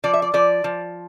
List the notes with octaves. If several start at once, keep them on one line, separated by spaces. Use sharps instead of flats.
F3 D5
E5
D5
F3 D5
F3